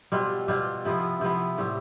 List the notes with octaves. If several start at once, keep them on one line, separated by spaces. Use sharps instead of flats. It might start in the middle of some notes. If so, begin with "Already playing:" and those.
B2 G3 C4 F4
B2 G3 C4 F4
C3 F3 B3 E4
C3 F3 B3 E4
A2 G3 C4